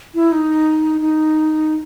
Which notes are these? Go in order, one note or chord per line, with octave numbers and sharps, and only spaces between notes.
E4
D#4
D#4